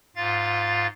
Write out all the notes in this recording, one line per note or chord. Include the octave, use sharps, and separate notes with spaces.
G#2 F4 F5 A6